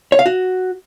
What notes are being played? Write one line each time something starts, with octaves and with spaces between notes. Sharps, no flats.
C#5
F5
F#4